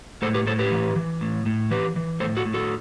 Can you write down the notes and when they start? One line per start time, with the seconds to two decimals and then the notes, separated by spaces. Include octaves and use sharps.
0.22 A2 A4 C5
0.34 G4 B4
0.47 A2 A4 C5
0.59 G4 B4
0.71 E3
0.96 E3
1.21 A2
1.46 A2
1.71 E3 G4 B4
1.96 E3
2.20 A2 A4 C5
2.37 F#4 A4
2.45 A2
2.54 F#4 A4